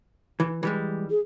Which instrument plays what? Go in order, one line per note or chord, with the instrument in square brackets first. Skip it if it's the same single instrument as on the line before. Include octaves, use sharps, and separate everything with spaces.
[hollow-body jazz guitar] E3
E3 G3 G#3
[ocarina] G#4